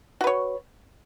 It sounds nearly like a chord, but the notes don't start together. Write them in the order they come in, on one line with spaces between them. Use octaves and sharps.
F#4 B4 C#5